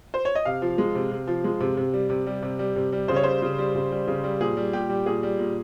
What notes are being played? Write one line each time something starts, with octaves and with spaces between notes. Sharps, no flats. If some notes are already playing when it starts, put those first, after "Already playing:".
C5
C#5
D#5
C3 F5
F3
G#3
C3
C3
F3
G#3
C3
C3
G3
C3
G3
C3
G3
C3
G3
C#3 C5
C#5
G3 C5
C#3
G3
C#3
G3
C#3
G3
A#2 G#4
G3
A#2 G4
G3
A#2 G#4
G3
A#2